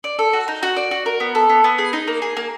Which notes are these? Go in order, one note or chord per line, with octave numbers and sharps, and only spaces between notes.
D5
A4
F#4
D#4
F#4
D5
F#4
A#4
B3
A4
B3
B3
G#4
D#4
A#3
G#4
A#3